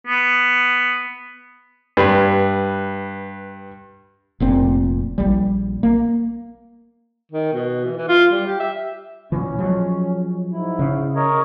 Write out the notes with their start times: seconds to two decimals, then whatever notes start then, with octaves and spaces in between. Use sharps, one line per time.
0.07 B3
1.97 G2 B4
4.40 F1 A#2 C4
5.18 A#1 G3
5.83 A#3
7.32 D#3
7.53 B2
7.84 E3
7.97 E3
8.08 F4
8.31 G3
8.47 G4
8.60 E5
9.32 A#2 E3 C#4
9.59 F3 F#3 G#3
10.52 G#2 E4
10.79 C#3
11.15 A#4 C#5 D#5